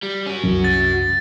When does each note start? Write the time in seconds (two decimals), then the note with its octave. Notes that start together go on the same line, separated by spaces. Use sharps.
0.03 G3
0.26 C#4 F#4
0.44 C2 F#2
0.64 A6